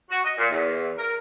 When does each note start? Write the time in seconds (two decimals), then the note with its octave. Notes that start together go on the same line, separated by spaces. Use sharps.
0.10 F#4
0.25 D#5
0.38 A#2
0.51 E2
0.97 A#4